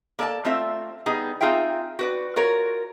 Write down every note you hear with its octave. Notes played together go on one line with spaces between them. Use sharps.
A#3 A4 D5 D#5 A5
A3 C4 F4 E5
G3 B3 D#4 G#4
C4 D#4 F4 G#4 E5 G5
F#4 B4 D5
F4 F#4 A#4 C#5